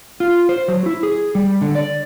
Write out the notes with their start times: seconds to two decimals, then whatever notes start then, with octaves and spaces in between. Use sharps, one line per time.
0.20 F4
0.49 C5
0.68 F#3
0.86 E4
1.03 G#4
1.35 G3
1.61 D3
1.75 D5